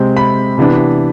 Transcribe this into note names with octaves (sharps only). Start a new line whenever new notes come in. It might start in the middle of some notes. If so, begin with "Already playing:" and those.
Already playing: C3 G#3 C4
B5
C3 E3 B3 D4